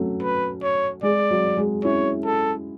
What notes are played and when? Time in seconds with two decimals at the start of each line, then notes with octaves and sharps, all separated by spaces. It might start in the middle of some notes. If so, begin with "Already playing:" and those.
Already playing: F#3 A3 C#4
0.23 B4
0.63 C#5
1.03 G#3 D5
1.30 F#3
1.57 G#3
1.84 C#4 E4 C#5
2.25 A4